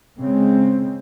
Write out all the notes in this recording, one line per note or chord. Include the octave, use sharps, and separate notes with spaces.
C#3 G#3 C4